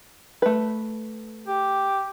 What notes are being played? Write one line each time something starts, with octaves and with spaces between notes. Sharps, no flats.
A3 B4
G4